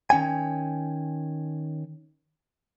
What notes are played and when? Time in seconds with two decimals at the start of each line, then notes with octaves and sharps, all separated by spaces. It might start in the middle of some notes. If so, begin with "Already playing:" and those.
0.10 D#3 C#4 G5 G#5